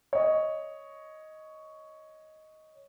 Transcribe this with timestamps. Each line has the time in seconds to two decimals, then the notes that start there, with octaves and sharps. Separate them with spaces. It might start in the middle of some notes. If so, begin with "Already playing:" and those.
0.13 C#5 D#5